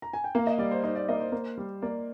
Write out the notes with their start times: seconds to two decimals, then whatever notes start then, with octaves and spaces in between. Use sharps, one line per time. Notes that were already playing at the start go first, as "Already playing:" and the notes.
0.02 A#5
0.13 G#5
0.24 G5
0.35 A#3 F5
0.47 D#5
0.58 G3 D5
0.71 C5
0.83 D#4 C5
0.95 D5
1.08 A#3 D#5
1.20 C5
1.32 A#3
1.57 G3
1.82 A#3 D5